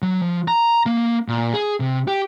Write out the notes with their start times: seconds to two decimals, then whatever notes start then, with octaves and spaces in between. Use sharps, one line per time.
0.02 F#3
0.22 F3
0.48 A#5
0.86 A#3
1.28 A#2
1.54 G#4
1.80 C3
2.08 G4